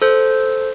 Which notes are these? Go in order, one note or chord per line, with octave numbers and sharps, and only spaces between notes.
A4 C5